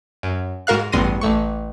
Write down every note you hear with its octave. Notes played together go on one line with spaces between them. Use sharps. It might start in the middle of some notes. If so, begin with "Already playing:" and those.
F#2
G#2 F#4 A#4 F5 F#6
A1 E2 G2 C6 A#6 D#7
A1 A3 C#6